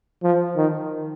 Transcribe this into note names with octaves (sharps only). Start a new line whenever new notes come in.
F3
D#3